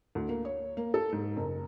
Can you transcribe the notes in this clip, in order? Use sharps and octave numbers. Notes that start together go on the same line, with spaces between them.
D2
A#3
C#5
A#3
A4
G#2
F#1